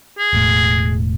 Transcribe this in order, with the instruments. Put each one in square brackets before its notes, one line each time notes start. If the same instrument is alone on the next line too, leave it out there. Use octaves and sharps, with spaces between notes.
[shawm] G#4
[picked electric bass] E1 A2